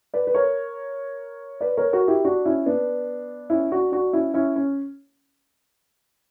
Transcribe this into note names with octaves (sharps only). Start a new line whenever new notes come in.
B4 D5
B4
A#4 C#5
B4 D5
A#4 C#5
F#4 A#4
E4 G4
D4 F#4
C#4 E4
B3 D4
C#4 E4
D4 F#4
D4 F#4
C#4 E4
C#4 E4
C#4